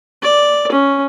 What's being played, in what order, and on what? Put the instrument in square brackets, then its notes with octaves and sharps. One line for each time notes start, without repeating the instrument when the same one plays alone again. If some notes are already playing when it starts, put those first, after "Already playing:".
[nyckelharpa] D5
C#4